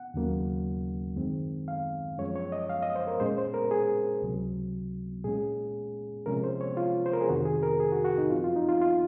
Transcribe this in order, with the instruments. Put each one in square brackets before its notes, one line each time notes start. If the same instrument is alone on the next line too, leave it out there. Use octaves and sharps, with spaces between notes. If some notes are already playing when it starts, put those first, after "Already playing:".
Already playing: [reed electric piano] F#5
D#2 C#3 F#3 A#3 C#4
F#2 D#3 G#3 C4
F5
F#2 F3 G#3 C#4 C#5
C#5
D#5
F5
D#5
C5
A#4
A#2 G#3 C#4 C5
C5
A#4
G#4
C#2 C3 F#3
A#2 G#3 C#4 G#4
C3 F3 G#3 C#4 A#4
C5
C#5
F4
C5
A#4
G#4
F2 C3 D#3 F#4
G#4
A#4
G#4
F#4
F#4
D#4
F#2 F3 C4 F4
F4
D#4
F4
F4